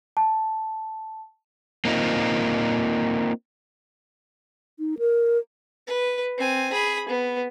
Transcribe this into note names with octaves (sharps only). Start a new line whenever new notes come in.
A5
A#3 C4 D#4 F4
D#4
A#4
B4
C4 G#5
G#4 B5
B3